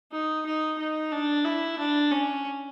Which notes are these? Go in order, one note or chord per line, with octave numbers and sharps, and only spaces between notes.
D#4
D#4
D#4
D4
E4
D4
C#4